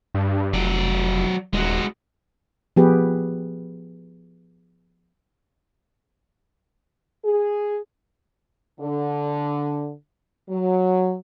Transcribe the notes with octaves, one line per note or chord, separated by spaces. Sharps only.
G2
F1 F#3 D5
D#1 G#3 F#4
F3 B3 G4 G#4 B4
G#4
D3
F#3